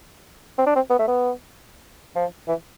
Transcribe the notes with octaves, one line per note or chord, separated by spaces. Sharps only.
C4
D4
C4
B3
A3
B3
F3
E3